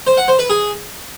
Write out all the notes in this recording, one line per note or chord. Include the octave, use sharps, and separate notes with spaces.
C5
F#5
C5
B4
G#4